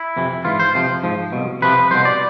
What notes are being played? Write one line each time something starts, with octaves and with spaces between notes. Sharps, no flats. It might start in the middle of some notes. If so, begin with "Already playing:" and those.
Already playing: E4
F2 C3 E3
G#2 E3 F4
C5
F2 C3 F3
G#2 F3
C2 B2
F2 C3 F3 B4
C2 B2 C5
D5